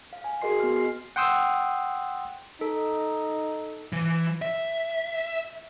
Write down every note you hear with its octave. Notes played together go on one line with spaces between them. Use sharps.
F5
G#5
F#4 G#4 A#4 D#5 C6 C7
B3 F#4 C6 F6
G#5 C7
F#5 G5 C6 D#6 E6
D#4 A4
E3
E5